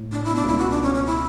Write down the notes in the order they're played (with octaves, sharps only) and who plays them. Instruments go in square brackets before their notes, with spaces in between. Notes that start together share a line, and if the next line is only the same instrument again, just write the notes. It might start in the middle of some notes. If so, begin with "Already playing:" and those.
Already playing: [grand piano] A2
[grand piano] A2 [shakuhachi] D4
[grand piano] B2 [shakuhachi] E4
[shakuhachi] D4
[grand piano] C#2 C#3 [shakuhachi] E4
[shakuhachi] F#4
D4
C#4
C#4
E4